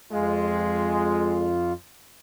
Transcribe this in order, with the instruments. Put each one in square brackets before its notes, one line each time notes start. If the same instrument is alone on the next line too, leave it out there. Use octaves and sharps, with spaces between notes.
[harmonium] F2 F4 [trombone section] G#3